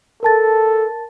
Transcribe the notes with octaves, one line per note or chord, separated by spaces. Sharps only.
A4 A#4 A5 A6